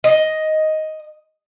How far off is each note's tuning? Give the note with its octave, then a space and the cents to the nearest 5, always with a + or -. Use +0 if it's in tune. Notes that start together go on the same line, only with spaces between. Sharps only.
D#5 +5